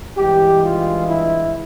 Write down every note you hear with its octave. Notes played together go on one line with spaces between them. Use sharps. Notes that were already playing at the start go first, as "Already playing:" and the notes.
G2 E3 G#3 G4
F4
E4